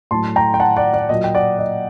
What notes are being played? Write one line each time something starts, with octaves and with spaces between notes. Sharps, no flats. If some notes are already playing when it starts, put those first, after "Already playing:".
A2 F#3 A3 A5 C6
G5 A#5
G5
F#5 A5
D5 F#5
D5
A#2 F#3 A#3 D#5
G5
D5 F#5
D#5